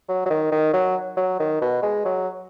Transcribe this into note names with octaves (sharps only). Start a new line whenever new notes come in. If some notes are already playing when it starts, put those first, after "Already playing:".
F#3
F#3
D#3
D#3
F#3
F#3
D#3
B2
G#3
F#3